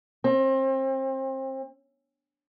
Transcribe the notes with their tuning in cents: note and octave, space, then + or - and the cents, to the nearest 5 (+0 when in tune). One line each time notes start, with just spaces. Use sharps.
C4 +30